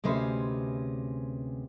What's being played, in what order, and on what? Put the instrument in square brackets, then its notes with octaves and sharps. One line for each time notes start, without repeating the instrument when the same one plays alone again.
[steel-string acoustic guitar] D2 C3 G#3 C#4 B4 C5